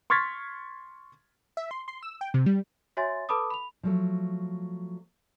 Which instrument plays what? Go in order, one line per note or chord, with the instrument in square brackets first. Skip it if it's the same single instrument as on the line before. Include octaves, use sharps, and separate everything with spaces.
[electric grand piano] C6 C#6 F6 G#6 A6 B6
[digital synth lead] E5
C6
C6
E6
G5
C3
G3
[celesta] F#4 C#5 E5 G#5 C6 A6
A4 B4 A5 B5 D6 D#6
B5 F7
[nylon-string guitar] F3 F#3 A3